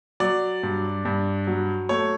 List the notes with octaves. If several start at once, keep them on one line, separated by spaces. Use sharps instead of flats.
F#3 D5
G2
G2
F#3
A3 C#5